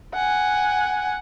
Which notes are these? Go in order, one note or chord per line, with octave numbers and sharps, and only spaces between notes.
F#5 G#5